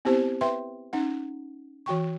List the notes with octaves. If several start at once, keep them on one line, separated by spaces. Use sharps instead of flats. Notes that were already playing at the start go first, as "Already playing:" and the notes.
B3 C4 E4 G4 C5 A5
B4 E5 G5 C6
C#4 D#4 F#5
E3 F#4 G5 C#6